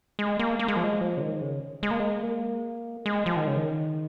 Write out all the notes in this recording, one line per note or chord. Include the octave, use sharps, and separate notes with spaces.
G#3
A#3
A#3
G#3
F3
G#3
F3
C#3
D#3
C#3
G#3
A#3
G#3
A#3
G#3
F3
D#3
C#3
D#3